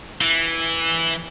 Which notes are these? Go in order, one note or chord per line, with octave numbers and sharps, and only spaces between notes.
E3